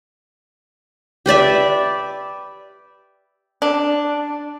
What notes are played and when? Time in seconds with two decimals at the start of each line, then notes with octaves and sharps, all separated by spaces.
1.26 G4 B4 D5 E5
3.62 D4